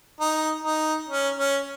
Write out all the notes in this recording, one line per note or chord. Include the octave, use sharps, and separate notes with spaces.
D#4
D#4
C#4
C#4